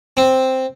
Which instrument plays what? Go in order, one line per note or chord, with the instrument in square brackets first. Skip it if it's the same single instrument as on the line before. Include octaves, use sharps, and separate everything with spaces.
[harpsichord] C4